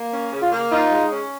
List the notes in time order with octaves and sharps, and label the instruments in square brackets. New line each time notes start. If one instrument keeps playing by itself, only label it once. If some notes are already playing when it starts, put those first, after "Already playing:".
Already playing: [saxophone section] A#3
C#4
C#3
[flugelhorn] F4
[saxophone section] A#3
[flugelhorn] D#4 [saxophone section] F4
[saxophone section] G#3
C#4